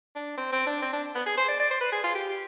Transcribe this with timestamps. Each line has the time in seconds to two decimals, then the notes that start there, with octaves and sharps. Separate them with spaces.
0.16 D4
0.38 C4
0.52 C4
0.67 D4
0.82 C4
0.93 D4
1.15 B3
1.26 G#4
1.37 C5
1.48 D5
1.59 D5
1.70 C5
1.81 B4
1.92 G#4
2.04 F4
2.15 G4